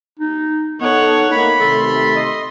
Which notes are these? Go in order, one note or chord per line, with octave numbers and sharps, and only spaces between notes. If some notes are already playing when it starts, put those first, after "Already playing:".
D#4
B3 D#4 A4 C#5 F#5
A3 A#3 D#4 B5
C3 D#3 A3 A4 C6
D#5